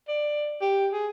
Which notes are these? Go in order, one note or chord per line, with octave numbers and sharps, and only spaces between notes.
D5
G4
G#4